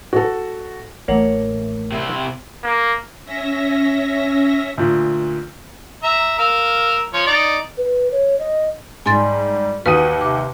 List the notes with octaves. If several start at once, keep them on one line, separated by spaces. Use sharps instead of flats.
F#4 A4
A1 A3 A#3 C#5 F#5
C3 E4
A#3
C#4 E5 A#6
D2 A#2
E5 A#5
A#4 F5 E6
F3 C#5
D#4 D5
B4
C#5
D#5
G#2 G3 G#5 C6 A6
D#2 F#4 B4 F#5 D#6 D#7
C3 D6